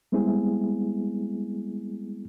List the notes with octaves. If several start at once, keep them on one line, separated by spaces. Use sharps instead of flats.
G3 G#3 B3 C4 E4 G#4